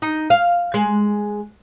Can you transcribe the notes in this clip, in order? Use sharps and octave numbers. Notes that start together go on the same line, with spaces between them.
D#4
F5
G#3